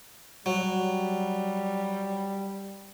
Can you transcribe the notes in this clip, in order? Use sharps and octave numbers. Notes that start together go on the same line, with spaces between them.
F#3 G3